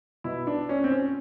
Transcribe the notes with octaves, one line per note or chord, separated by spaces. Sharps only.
B2 E4
D4
C#4
C4
C#4